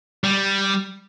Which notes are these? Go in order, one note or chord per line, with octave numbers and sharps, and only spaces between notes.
G3